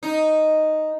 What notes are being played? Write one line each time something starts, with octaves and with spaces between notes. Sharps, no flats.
D#4